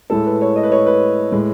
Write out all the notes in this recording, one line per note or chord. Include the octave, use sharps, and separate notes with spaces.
A2 G#3 A4
B4
C#5
D#5
B4
C#5
B4
A2 G#3